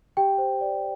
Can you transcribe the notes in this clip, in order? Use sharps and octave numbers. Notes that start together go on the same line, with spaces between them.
G4 G5
C5
D5